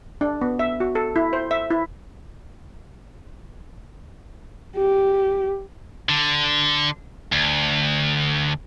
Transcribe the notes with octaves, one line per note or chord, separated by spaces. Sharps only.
D4
B3
E5
F#4
A4
E4
C5
E5
E4
G4
D3
D2